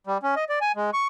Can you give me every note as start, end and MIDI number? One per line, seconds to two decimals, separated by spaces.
0.07 0.18 55
0.23 0.35 61
0.36 0.44 75
0.49 0.59 74
0.61 0.72 80
0.76 0.90 56
0.93 1.08 85